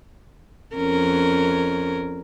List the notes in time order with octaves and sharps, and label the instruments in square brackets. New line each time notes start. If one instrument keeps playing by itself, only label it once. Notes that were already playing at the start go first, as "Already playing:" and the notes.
[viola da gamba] F2 C#4 A#4